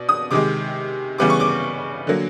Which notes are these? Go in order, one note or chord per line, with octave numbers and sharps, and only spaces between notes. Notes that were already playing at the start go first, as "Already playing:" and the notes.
Already playing: B2 D5
D#6
C3 D#3 G#3 D6
C#3 E3 G3 B3 D6
C#6
D6
D3 F#3 A#3